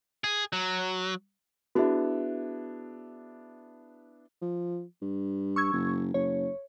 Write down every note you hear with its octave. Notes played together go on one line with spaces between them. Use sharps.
G#4
F#3
B3 D4 E4 F#4 G#4 E5
F3
G2
C#6 E6 G#6
F#1
F#1 C#5